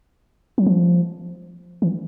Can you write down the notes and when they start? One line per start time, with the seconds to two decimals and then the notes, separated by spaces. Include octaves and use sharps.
0.58 F#3
0.66 F3
1.82 E3